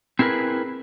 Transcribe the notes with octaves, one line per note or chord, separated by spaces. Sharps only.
C4 E4 G#4 A#4 B4